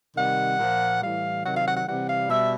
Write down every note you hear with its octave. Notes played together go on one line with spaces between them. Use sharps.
C3 D#3 G3 F#5
A#2 F3
A2 E3 G3 F5
C3 D#3 F#3 F#5
F5
F#5
F#5
C3 E3 G3 F#5
F5
B2 G3 E5